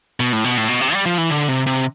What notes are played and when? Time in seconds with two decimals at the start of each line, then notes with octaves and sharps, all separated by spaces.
0.20 B2
0.33 A2
0.44 B2
0.57 A2
0.68 B2
0.81 C3
0.94 G3
1.06 F3
1.18 E3
1.30 D3
1.48 C3
1.66 C3